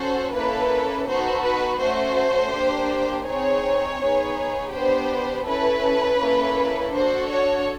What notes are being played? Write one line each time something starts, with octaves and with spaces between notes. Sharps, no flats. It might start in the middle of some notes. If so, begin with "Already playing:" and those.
Already playing: C#4 F#4 A4 C5
A#3 C#4 E4 A4 B4
B3 D#4 F#4 A4 C5
B4
A3 C#4 F#4 A4 C5
A#3 D4 G4
C4 D#4 G#4 C#5
B3 D#4 G#4
B3 D4 G4 C5
C#4 E4 A4 B4
A#3 C#4 E4 A4
D4 F#4 A4 C5
C#5